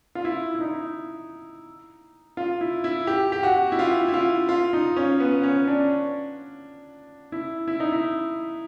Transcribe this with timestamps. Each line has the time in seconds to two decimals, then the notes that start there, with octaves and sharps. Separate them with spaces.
0.15 F4
0.25 E4
0.55 E4
0.61 D#4
2.37 F4
2.61 E4
2.84 E4
3.07 G4
3.32 G4
3.43 F#4
3.72 E4
3.79 F4
4.08 E4
4.14 F4
4.49 F4
4.73 D#4
4.97 C#4
5.20 B3
5.43 C#4
5.67 D4
7.32 E4
7.68 E4
7.80 D#4
7.92 E4